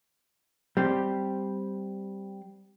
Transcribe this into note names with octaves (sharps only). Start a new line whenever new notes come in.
G3 C4 G4